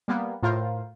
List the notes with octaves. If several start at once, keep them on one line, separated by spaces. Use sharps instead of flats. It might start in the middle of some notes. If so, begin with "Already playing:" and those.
G3 A#3 B3
A2 F4 A#4 C5